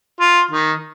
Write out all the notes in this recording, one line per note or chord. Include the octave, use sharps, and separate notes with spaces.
F4
D#3